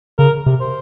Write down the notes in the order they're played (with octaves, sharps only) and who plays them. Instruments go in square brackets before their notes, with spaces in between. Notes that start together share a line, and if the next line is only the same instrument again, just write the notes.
[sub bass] C#3 [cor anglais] A#4
[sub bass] C3
[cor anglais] C5